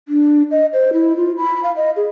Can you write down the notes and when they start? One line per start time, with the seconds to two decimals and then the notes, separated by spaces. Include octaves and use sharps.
0.08 D4
0.51 D#5
0.73 C5
0.93 E4
1.17 F4
1.37 B5
1.63 F5
1.76 D#5
1.96 G#4